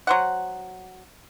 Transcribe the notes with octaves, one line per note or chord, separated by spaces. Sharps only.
F#3 C5 F#5